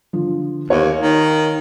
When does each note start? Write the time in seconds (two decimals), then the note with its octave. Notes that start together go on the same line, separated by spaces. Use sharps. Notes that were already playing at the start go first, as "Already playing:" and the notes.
0.13 D3 F3
0.70 D#2 C#5 F5
1.01 D#3